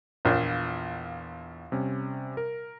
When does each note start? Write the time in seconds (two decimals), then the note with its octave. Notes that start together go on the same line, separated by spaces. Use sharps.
0.25 A#1 E2 F5 G#6
1.72 C3 G3 C#4
2.37 A#4